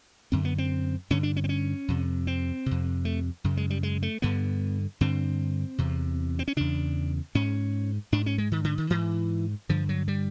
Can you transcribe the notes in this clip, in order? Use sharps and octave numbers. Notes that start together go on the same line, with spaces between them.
F#2 D3 C4
B3
C4
G2 D3 C#4
D4
C#4
C4
C#4
F2 C3
C4
F2 C3
A3
F#2 C#3
G#3
G3
G#3
A3
G2 D3 B3
G2 D3 C4
E2 C3
C4
C#4
E2 C#3 D4
G#2 C#4
G#2 D4
C#4
G#3
D#3
D3
D#3
G#2 E3
G2 D3 F3
F#3
G3